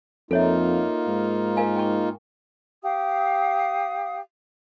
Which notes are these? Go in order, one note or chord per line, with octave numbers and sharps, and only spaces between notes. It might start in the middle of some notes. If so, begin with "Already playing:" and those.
F2 A#3 D#4 F4 A4 C#5 E5
G#2
A#4 F5 G#5
G5 C#6
G4 F5 D#6